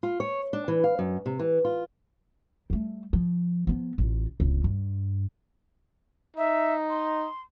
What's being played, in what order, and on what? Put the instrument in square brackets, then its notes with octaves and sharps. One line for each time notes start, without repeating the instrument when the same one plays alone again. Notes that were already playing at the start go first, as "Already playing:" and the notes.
[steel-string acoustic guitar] F4
C#5
D4
E3
F5
F#2
C3
E3
F4
[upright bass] G3 A3
F3
F3 B3
A1 F4
D1 C#2
G2
[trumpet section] D#4 [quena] E5
[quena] C6